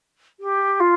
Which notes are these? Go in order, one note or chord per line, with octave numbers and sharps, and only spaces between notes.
G4
F4